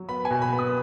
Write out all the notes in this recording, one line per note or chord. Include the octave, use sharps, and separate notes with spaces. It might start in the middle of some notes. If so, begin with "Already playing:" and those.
Already playing: F#3
B3 B5
G#5
B2
B5
B3
D#6